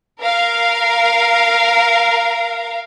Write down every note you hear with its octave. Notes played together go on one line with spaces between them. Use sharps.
A#4 F5